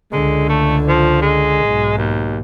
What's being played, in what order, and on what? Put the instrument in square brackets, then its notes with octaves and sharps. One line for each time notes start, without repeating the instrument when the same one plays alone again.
[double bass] C#2 D3 [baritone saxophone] G#3
[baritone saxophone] A3
F3
G#3
[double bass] B1 G#2
[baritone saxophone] D#2